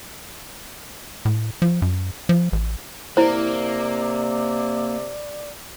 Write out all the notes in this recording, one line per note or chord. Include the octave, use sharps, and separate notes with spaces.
A2
F3
F#2
F3
A1
C3 A#3 E4 C5 D5